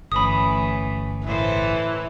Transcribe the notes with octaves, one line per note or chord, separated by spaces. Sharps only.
G1 E3 A3 C#4 B5 D#6
A2 E3 A4 C5